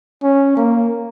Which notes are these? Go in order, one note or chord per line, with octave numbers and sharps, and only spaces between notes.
C#4
A#3